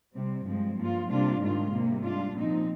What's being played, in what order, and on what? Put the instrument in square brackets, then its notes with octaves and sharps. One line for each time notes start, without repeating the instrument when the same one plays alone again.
[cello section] C3 G3 C4
G2 F3 G#3 C4
G2 F3 A#3 F4
C3 G3 A#3 D4 F4
G#2 D#3 G3 D4 F4
C3 G3 A#3
G#2 G3 D4 F4
A#2 F3 C4 D#4